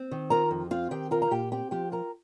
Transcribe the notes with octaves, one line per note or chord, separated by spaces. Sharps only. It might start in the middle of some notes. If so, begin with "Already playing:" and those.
Already playing: C4
D#3
F4 A#4 A#5
F2
C4 F4 F5
D#3 G4 G5
F4 A#4 A#5
A#5
A#2 G4 G5
C4 G4 G5
F3 G4 G5
F4 A#4 A#5